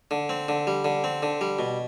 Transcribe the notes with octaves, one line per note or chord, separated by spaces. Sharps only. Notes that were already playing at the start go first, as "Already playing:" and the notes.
D3
C4
D3
G3
D3
C4
D3
G3
B2